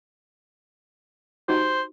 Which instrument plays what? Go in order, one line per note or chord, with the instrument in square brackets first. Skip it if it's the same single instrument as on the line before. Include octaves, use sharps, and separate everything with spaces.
[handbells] D#4 F#4 G4 [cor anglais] C5